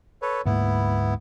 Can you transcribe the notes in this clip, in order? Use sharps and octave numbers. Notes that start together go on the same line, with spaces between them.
A4 B4 C#5
D2 G#2 A#3 B3 E4